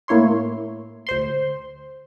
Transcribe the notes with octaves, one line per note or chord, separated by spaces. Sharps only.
A2 A#3 E4 C#5 C6
D2 C5 C6